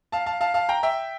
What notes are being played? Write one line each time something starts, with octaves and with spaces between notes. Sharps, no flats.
F5 A5
F5 A5
F5 A5
F5 A5
G5 A#5
E5 G5